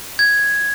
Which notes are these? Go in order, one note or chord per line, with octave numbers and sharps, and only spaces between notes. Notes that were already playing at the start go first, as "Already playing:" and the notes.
G#6